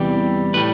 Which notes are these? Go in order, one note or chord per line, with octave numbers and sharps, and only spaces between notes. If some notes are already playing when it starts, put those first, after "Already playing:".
Already playing: E2 C3 E3 G3 G4
A2 G3 B4